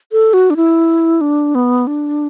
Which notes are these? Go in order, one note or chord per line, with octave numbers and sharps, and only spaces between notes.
A4
F#4
D4
E4
D4
B3
D4